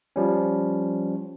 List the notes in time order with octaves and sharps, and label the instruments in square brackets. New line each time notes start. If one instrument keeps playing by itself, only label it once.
[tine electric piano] F3 G3 C#4